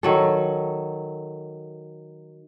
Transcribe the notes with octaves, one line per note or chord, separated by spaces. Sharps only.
D#3 F#3 A4